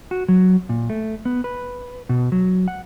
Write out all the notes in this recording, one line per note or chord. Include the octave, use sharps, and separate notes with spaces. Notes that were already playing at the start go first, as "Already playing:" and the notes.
F#4
F#3
A#2
A3
B3
B4
B2
F#3
F#5